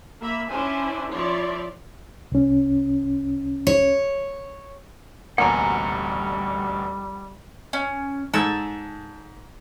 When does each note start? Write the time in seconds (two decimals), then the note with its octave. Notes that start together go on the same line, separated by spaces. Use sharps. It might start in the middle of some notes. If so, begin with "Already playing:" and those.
0.21 A#3 E5 B5
0.51 C#4 D4 E4 C5 G#5
1.12 F3 E4 C#5 D5 C6
2.32 C2 C#4
3.67 C#5
5.38 A1 D2 B2 G3 A#3 F#5 G#5 A#5
7.73 C#4
8.34 G#2 A4 G#5 A5 E6